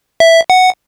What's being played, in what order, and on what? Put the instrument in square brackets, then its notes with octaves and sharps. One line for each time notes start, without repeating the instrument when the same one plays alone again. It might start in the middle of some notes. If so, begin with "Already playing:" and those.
[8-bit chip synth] E5
F#5